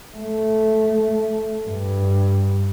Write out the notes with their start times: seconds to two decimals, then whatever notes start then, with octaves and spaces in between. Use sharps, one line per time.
0.16 A3
1.67 G2